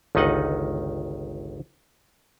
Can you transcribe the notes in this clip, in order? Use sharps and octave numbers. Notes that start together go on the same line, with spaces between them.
G1 C#2 D#3 D#4 D#5 F#5